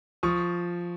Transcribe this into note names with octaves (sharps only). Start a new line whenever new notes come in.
F3 C#6 D#6